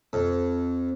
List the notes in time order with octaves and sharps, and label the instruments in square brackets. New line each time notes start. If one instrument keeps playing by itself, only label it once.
[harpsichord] F2